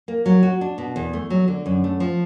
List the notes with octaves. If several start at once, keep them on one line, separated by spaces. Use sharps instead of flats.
A#3
F#3
F#4
D4
B2
E2
A3
F#3
D3
F#2
A3
F3